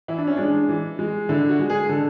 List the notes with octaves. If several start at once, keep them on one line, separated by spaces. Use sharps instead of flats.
E3 E4
D4
C#4
G#3 D4
E3
G#3
D3 E4
F#4
G#3
G#4
D3 A4